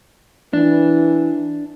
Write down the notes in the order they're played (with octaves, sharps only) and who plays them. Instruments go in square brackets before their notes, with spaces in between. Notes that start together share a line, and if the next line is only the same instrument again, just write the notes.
[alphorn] E3 [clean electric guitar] D4